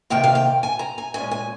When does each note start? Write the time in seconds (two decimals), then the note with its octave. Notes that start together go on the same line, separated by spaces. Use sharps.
0.10 C3 D#3 A#3 G5
0.24 F5
0.35 G5
0.63 G#5
0.79 A#5
0.98 G#5
1.14 A#2 G#3 C#4 G#5
1.31 G#5